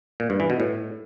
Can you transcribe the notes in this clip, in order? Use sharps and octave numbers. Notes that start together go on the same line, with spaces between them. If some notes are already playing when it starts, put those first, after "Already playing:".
A#2
G2
E3
B2
A2